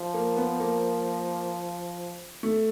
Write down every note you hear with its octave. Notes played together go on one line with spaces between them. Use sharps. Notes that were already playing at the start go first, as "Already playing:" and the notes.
Already playing: F3
A#3
B3
A#3
A3